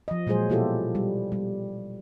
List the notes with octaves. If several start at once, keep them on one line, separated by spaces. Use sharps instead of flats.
F3 D#5
A#2 F#3 G#3 G#4 C5
B2 E4 F4 G4 A4
G3
G3